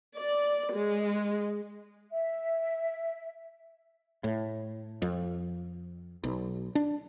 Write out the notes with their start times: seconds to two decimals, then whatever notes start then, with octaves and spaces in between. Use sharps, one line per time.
0.16 D5
0.72 G#3
2.12 E5
4.24 A2
5.02 F2
6.24 B1
6.75 D4